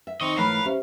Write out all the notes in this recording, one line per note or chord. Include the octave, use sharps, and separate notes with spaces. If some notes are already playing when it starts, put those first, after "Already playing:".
E5
D#3 C4 D#4 D#5 C#6
G#2 E3 A3 A#4 B4 C#5 F5 B5
C#4 G4 C5 E5